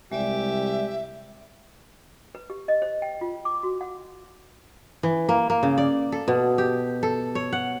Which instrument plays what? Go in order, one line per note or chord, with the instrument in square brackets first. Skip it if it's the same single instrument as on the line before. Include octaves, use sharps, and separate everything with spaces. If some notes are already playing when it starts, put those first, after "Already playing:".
[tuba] C2 [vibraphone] G#3 D5 [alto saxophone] G4 [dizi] E5
[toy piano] B4
G4
D#5
C5
G5
F4
D6
F#4
F#5
[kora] E3
A#3
A#3
C#3
D5
A4
B2
G4
A4
C#5
F#5